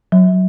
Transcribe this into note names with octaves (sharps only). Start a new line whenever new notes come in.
F#3